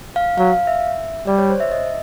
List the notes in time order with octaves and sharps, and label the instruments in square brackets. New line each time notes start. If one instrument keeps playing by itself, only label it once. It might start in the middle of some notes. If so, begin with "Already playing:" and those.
[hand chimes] F5
[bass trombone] F#3 [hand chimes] F5
[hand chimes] F5
E5
[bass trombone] G3 [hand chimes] D5
[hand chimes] C#5
C5
E5
D#5